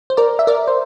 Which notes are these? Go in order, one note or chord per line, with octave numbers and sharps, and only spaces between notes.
C5
A#4 D5
E5
A#4 D5
C5